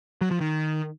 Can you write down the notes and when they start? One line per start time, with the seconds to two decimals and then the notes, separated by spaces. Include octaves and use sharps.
0.21 F#3
0.31 F3
0.41 D#3